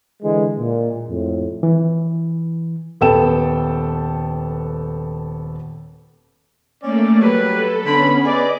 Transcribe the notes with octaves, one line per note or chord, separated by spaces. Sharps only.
D3 E3 G#3
A#2
F2 A2
E3
D#1 B3 A4 G5 E7
A3 A#3 C#4 D5
F#3 G3 B4
A4
D3 B3 C#4 B5
G#4 B4 D5 D#5 D6